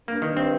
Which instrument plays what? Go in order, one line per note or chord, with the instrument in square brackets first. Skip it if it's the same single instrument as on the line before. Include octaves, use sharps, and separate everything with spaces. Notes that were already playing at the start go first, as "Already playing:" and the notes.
[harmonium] G2 [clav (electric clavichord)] A#3
[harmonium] G2 [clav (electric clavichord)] D#3
[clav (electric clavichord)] C4